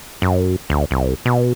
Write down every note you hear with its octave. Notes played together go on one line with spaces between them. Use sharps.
F#2
D2
C2
B2